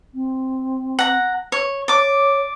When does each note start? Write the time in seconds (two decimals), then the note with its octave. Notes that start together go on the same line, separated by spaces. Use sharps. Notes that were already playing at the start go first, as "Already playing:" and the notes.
0.14 C4
0.99 F#5 A#5
1.52 C#5
1.88 C#5 D5 D6